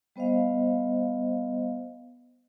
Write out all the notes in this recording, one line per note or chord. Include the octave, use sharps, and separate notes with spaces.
G3 B3 C5 D#5 F5